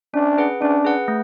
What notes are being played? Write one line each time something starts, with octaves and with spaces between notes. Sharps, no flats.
C#4 D4
G#4 B4 F#5
C#4 D4
G#4 B4 F#5
A3